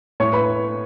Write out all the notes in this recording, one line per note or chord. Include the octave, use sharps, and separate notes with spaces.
A2 C#5 C#6
B4 B5